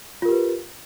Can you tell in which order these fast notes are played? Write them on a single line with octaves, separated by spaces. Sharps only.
F4 A#4 G4 B4